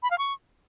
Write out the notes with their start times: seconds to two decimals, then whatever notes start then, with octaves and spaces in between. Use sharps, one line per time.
0.03 B5
0.10 F5
0.18 C#6